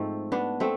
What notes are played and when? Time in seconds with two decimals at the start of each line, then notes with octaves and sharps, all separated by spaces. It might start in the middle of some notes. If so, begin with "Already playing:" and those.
Already playing: G#2 F3 A3 C4
0.32 B3 D4
0.60 A3 C4